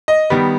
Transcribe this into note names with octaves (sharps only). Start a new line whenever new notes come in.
D#5
D#3 G3 B3